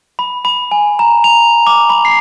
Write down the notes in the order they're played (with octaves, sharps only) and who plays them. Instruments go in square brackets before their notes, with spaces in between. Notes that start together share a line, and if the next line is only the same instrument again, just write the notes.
[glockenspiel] B5
B5
G#5
A#5
F7
D6
B5
C7